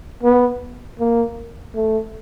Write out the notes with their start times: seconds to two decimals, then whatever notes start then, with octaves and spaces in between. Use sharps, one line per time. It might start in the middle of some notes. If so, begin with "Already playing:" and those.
0.23 B3
0.99 A#3
1.75 A3